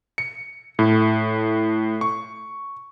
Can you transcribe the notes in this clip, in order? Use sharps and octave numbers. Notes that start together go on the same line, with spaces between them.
C#7
A2
C#6